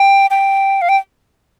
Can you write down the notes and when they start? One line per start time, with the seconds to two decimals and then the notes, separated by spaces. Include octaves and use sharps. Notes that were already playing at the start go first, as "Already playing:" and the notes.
Already playing: G5
0.30 G5
0.82 F5
0.89 G5